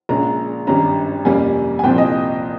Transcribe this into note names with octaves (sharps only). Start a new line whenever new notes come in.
A#1 A#2 G#3 C#4 A#5
G#1 G2 G3 C#4 A#5
F2 C3 G3 A#3 C#4 G#5
G#5
C2 A#2 F3 C4 G5
D#5